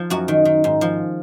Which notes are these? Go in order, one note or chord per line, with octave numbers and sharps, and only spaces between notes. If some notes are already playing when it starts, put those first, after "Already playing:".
Already playing: F3
F#2 F#4
D#3
D#3
G#2
F3